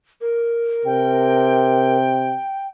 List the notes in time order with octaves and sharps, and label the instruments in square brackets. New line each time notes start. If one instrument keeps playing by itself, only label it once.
[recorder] A#4
[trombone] C3 [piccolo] G5